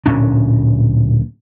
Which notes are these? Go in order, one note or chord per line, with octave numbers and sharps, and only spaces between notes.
D1 A#2 C#4 D4